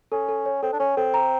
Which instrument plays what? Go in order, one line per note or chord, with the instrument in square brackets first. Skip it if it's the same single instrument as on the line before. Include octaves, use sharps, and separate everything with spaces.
[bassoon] C#4 [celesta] A4
[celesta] A4
C#5
[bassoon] C4 [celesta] A4
[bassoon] D4
[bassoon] C#4 [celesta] C#5
[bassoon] C4 [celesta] A4
[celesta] A#5